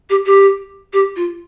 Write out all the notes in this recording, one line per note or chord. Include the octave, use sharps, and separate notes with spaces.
G4
G4
G4
F4